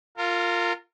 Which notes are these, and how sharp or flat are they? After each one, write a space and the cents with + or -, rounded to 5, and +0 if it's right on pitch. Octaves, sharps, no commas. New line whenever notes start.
F4 +0 A#4 -30